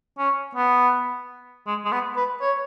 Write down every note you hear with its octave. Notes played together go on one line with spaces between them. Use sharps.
C#4
B3
G#3
G#3
B3
B4
C#5